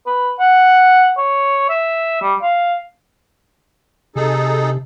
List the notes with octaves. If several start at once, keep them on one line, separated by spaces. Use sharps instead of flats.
B4
F#5
C#5
E5
G3
F5
C3 D#4 G#4 A4